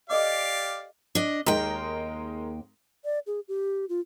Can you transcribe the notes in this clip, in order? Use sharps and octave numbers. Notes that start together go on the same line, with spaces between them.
G4 A4 D5 D#5 F5 D6
D4 D#5
D#2 G#3 D#4 A#4 G5
D5
G#4
G4
F4